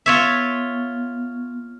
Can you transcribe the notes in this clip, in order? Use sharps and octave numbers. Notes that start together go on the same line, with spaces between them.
B3 F4 C#5 E5